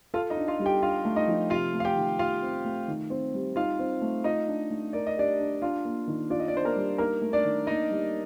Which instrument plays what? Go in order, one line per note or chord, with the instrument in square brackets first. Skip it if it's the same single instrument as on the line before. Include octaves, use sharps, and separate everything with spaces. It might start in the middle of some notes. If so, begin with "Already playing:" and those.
[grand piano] F4 F5 [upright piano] A4
[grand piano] D#4 D#5
[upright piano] D4
[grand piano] F4 F5
[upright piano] G3
[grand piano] G4 G5
[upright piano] D4 [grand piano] F4 F5
[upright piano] A3
[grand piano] D#4 D#5
[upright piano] F3
[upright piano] C3 [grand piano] F4 F5
[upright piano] A3
[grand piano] F5
G4 G5
[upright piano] D#3
[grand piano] F4 F5 [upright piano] G4
[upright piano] C4
A3
D#3
C4
G3
[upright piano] D#4 [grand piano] F4 F5
[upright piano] C4
A3
[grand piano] D#4 D#5 [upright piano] F4
[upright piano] D4
A3
[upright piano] A#4 [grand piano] D5
[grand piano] D#5
[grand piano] D4 D5 [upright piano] G4
[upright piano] D4
[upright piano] D4 [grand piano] F4 F5
[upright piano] A#3
D#3
[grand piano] D4 D5 [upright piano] F4
[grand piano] D#5
D5
[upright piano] D4 [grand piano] C5
[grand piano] A#3 A#4
[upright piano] G3
[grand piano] A#3 A#4 [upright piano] D#4
[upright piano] A3
[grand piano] D4 D5
[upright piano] D#3
[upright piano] A#3 [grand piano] D#4 D#5
[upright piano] G3